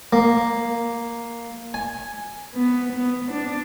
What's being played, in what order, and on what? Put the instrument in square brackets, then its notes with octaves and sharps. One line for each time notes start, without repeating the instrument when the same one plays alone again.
[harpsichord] A#3
G#5
[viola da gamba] B3
B3
D4